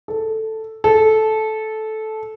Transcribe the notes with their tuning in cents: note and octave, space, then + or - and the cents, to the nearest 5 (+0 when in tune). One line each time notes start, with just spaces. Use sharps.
A4 +0
A4 -15